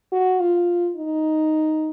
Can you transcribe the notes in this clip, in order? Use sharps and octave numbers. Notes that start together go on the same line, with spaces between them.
F#4
F4
D#4